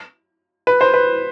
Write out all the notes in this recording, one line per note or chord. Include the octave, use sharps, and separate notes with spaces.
B4
C5
B4